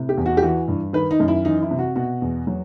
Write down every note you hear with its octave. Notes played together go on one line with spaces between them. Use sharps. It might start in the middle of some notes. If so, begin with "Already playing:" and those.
Already playing: A2 C3
G4
E2
F#4
G4
E3 F#4
G2
D#3 B4
D#4
F#2
E4
E3 D#4
E4
C3
F#4
B2 F#4
E2
F#3